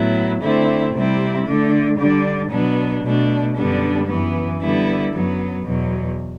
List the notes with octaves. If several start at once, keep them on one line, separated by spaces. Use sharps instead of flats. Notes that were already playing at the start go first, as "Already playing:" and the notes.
Already playing: A2 F#3 B3 E4
D3 A3 C4 E4
C3 G3 C4 E4
D3 A3 D4
D3 G3 D4
B2 F#3 B3 D4
B2 A3 D4
F#2 D3 G3 B3 D4
F#2 E3 B3
D3 G3 B3 E4
F#2 F#3 B3
E2 B2 F#3